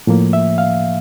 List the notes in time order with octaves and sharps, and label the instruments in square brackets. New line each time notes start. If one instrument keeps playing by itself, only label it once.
[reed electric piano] A2 F3 A#3
E5
F5